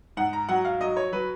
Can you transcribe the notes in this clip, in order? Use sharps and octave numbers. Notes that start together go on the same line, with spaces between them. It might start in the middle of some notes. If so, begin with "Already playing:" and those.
G#2 F#5
A#5
F#3 F#5
F5
F#3 D#5
C#5
F#3 B4